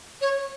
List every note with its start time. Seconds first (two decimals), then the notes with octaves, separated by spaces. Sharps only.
0.21 C#5